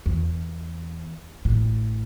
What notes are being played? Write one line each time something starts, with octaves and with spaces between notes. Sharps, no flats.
E2
A1 A2